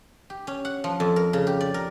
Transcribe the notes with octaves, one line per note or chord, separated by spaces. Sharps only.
G4
C#4
F#5
F3
F2
A#4
C#3
G4
D5
A#4